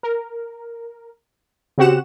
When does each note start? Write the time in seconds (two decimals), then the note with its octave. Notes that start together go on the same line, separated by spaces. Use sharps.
0.03 A#4
1.78 C#3 C4 F#4 G4 F#5 E7